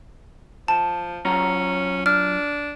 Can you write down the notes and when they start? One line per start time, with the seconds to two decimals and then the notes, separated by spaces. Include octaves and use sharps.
0.68 F3 A5
1.25 F#3 C#4 F4 A#5
2.06 D4 F6